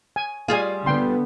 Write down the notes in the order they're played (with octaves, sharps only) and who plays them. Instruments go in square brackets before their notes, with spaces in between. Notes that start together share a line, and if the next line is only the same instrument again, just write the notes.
[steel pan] G#5
[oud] G3 F4 G#4 [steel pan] F5 G#5
[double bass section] D3 B3 [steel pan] G5 C6